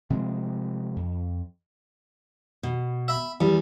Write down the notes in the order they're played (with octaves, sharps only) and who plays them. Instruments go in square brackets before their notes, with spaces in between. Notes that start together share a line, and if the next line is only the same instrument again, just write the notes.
[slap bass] C3 F3 G#3
F2
[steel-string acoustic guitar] B2
[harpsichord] E5 B5
[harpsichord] E2 [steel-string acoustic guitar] G3